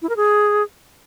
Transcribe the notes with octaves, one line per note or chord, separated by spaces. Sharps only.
E4
A#4
G#4